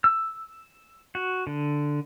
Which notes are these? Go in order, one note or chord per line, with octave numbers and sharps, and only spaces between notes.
E6
F#4
D3